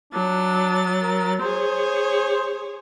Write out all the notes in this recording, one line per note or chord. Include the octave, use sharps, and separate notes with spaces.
F#3 D4 A6
A#4
G#4 C5 C#5